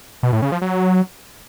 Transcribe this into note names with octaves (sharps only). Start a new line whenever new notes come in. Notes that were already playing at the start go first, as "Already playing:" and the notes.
B2
A2
C#3
F3
F#3